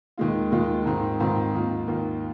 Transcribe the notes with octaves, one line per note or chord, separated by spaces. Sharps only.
D#2 D#3 G#3 F4
D#2 D#3 G#3 F4
G#2 D#3 C4 F4
G#2 D#3 C4 F4
D#2 D#3 A#3 F4
D#2 D#3 A#3 F4